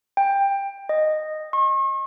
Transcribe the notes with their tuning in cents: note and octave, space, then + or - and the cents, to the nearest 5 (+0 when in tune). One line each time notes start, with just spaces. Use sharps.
G5 +15
D#5 -10
C#6 -40